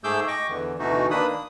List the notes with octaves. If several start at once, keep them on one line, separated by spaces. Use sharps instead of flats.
G#2 A3 G#4 D6 E6 G6
D#5 G5 C#6 D6
E2 D3 E3
D2 B2 E3 A3 D#4 F#4
D#3 A#3 D4 B4 B5 D#6
D#6